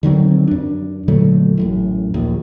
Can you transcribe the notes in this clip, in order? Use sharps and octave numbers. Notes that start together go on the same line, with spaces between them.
D3 D#3 F#3 C4
F#2 D4
A#2 D3 F#3 A3
A1 F#2 A2
A#1 D#2